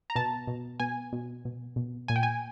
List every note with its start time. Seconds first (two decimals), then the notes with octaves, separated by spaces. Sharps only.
0.10 A#5
0.16 B2 A5
0.47 B2
0.80 B2 G#5
1.13 B2
1.45 B2
1.76 B2
2.08 A#2 G#5
2.16 G5
2.23 G#5